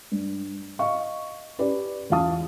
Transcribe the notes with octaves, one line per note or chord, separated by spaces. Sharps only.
G2
D#5 F5 C#6
C#4 G4 B4 D5
E2 C#4 F4 F5 A5 D#6